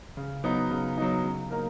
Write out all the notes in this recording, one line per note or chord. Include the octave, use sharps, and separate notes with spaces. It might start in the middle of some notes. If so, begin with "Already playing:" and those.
C#3
F#3 B3 D#4
C#3
F#3 B3 D#4
C#3
F#3 A#3 D#4 A#4